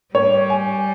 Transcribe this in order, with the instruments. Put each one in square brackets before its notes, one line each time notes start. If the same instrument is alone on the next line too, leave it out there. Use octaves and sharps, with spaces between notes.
[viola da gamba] G3 [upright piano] C#5
[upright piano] G#5